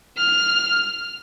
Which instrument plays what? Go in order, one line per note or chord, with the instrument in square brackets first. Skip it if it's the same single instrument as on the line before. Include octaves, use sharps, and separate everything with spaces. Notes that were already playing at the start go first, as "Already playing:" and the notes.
[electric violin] F6